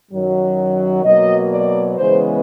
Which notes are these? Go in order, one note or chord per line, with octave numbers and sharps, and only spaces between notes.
F#2 D#3 F#3
B2 F#3 A#3 D#5
D5
C#3 E3 G#3 B3 C5